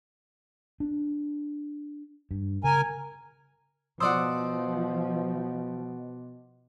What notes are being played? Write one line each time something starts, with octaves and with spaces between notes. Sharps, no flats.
D4
G2
C#3 A#4 G#5
B2 F3 C5 D5 F#5 D#6 E6